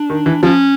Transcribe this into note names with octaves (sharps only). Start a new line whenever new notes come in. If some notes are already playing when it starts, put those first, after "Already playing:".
Already playing: D4
D#3
E3
F3 C#4